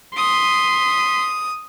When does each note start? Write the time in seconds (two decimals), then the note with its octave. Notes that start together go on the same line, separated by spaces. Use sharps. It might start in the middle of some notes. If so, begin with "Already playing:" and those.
0.17 C6 D#6 B6